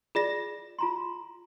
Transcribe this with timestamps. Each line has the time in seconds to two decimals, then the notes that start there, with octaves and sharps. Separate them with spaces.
0.15 F4 G#4 D5 A#6
0.79 F4 A#5 C6